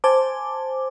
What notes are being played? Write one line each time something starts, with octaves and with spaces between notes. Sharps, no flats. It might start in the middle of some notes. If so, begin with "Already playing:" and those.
C5 G#5 A5 D6